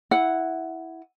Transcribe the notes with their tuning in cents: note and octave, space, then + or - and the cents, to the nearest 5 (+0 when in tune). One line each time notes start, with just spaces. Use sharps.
E4 -5 F#5 +0